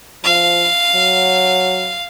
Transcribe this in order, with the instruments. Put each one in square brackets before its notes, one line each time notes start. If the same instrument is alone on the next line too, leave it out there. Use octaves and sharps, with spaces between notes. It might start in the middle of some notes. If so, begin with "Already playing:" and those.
[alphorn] F3 [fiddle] F5
[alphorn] F#3